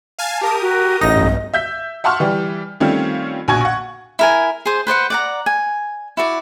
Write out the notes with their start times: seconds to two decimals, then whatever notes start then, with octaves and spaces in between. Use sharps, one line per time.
0.19 F5 G#5 A5
0.41 G4 A#4 A5 D#6
0.62 F#4
1.01 A1 D#4 D#5 A#6
1.16 B1 G2
1.54 E5 G6 B6
2.04 E5 F#5 A5 C6 C#6 F6
2.20 E3 G3 G4
2.80 D#3 G3 A3 C4 C#4 F4
3.48 A#1 B2 F#4 G#5 C#6 G#6
3.61 F#5 C#6
4.19 E4 A#4 G#5
4.66 G#4 C5
4.87 B4 C5 D5 F#5
5.10 D5 F#5 A#5
5.46 G#5
6.17 E4 F#4 D5